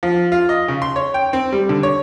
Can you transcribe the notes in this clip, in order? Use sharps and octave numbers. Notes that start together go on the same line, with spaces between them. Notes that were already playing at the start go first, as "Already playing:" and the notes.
F3
F4
D#5
C#3
C6
C#5
G5
C4
G3
D3
C#5